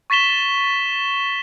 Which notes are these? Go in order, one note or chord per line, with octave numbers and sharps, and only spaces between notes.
C#6 A6 B6 E7 G7